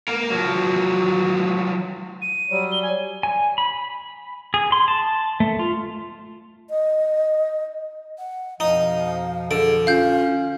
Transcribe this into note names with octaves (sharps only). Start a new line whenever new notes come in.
A#3 A#4
F3 F#3
D#7
F#3 G3
G7
G#5
G#5
B5
G#4
C6
A5
A3
F4
D#5
F#5
F2 B2 F3 D#4 F5
D3 G#4 D7
C#4 F4 F5 G6